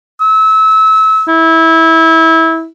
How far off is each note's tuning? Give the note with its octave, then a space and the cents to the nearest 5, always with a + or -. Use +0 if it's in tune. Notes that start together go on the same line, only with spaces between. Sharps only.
E6 -30
E4 -20